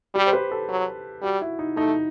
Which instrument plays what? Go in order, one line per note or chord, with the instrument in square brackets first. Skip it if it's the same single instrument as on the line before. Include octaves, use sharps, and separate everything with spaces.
[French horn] G3 [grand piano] G4
[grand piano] C5
B4
A4
[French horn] F#3
[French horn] G3 [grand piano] F#4
[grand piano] E4
D#4
[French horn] A3 [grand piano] D#4